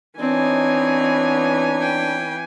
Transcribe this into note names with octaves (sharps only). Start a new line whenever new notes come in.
E3 B3 C4 D4 D#4 C#5 G#5
G5